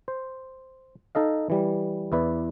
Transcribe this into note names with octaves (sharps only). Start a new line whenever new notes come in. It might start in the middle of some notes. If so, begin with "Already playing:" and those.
C5
D#4 A4 D#5 F5
E3 G3
E2 E4 B4 D5